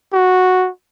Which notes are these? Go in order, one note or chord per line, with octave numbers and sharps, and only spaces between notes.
F#4